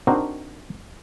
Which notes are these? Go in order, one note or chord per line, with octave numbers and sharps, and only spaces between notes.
C4 D4 D#4 F#4 A#4 C5